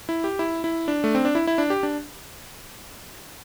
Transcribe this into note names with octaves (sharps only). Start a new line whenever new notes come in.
E4
G4
E4
E4
D4
A3
C4
D4
E4
E4
D4
G4
D4